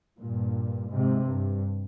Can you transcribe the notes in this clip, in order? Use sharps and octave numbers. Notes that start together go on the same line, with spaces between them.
G2 A#2
G#2 C3
G2